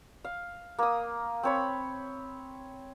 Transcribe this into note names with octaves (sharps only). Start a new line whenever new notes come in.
F5
A#3 D#6
C4 C#5 B5